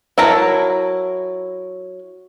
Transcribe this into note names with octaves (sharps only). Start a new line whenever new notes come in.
F#3 E4 A#4 A5 A#5